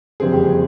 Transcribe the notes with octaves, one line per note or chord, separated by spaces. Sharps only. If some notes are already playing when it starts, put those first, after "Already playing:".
F#1 F2 D3 G3 C4 G#4
G4
G#4